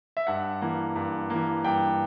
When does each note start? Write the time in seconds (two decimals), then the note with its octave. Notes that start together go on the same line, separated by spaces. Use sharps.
0.17 E5
0.27 G2 F#5
0.61 E3 A#3
0.96 G2
1.30 E3 A#3
1.64 G2 G5